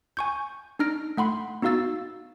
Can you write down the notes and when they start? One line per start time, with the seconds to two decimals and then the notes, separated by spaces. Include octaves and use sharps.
0.17 G#5 C#6 G6
0.79 D4 D#4 F6 A#6 D7
1.17 A3 F#5 B5 C6
1.62 B3 D#4 F#4 F5 E6 A6